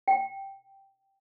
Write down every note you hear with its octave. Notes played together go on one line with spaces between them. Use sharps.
G5